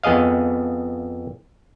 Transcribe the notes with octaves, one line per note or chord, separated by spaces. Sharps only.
F2 B3 G#4 D#5 F5